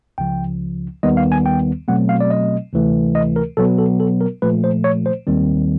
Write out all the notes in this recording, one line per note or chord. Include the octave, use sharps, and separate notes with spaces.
C#2 C#3 F3 G5
D#2 D#3 G3 B3 D#5
F5
G#5
G5
B2 F#3 A3 C4 F#5
F5
D5
D#5
D2 C3 E3 A3
D#5
A#4
B2 F#3 B3 A4
A4
A4
A#4
A#2 F3 A3 B4
C5
C#5
C5
D#2 D#3 G3 C4